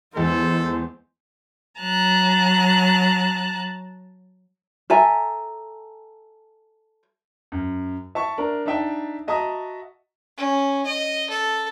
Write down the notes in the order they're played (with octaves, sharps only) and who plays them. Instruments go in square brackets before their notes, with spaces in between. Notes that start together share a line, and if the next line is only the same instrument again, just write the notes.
[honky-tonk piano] E2 G#3 [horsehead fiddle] B3 C5 [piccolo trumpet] A4
[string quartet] F#3 A5 A#5 F#6
[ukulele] A4 E5 G#5 A#5
[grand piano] F#2
E5 A5 C#6
D4 A#4
D4 D#4 E5 G5 A5
F#4 D#5 E5 A5 A#5 D#6
[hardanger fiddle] C#4
D#5
A4